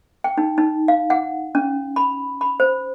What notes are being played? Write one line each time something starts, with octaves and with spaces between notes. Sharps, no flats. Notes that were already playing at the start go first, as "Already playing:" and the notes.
G5
D#4
D#4
F5
F#5
C#4
B5
B5
C5